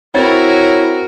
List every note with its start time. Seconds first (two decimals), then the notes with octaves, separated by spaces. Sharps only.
0.14 C4 E4 F#4 A#4 C#5 A6